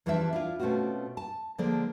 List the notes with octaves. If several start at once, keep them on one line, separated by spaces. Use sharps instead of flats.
E2 E3 F3 G3 D4 E5
D4 E4 F4
B2 A3 C4 C#4 F4 F#4
A5
D3 F3 G#3 A#3 D5